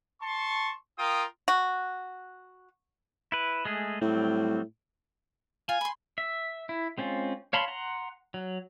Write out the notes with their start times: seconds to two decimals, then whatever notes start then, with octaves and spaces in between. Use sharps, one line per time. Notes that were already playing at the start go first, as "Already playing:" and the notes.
0.21 A5 C6 C#6
0.98 F4 A#4 F5 G5 A#5 D#6
1.48 F#4
3.32 E4 B4
3.65 G#3 A3 G#4
4.01 A2 F#3 G3 C4
5.69 F4 G#5
5.81 B5 C6
6.18 E5
6.69 E4
6.98 G#3 C4 C#4 F4
7.53 C#5 F5 A5 B5 C6
7.68 F#5 A#5 C6
8.34 F#3